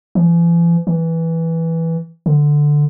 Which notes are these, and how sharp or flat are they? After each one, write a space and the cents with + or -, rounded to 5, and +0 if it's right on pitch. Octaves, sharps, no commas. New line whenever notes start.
E3 +45
E3 -5
D3 +5